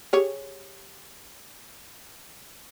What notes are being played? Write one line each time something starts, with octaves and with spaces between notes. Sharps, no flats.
G4 G#4 C#5